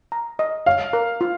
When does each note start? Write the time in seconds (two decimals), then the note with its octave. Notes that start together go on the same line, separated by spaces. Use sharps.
0.12 A#5
0.39 D#5
0.66 C#5 F5
0.93 A#4
1.21 F4